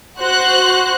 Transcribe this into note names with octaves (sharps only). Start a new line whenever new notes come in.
F#4 C5 F#6